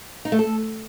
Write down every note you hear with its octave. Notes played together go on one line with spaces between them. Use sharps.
D#4
A3
A4